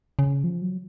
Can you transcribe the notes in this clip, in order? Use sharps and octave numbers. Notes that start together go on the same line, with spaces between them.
C#3
F3
F#3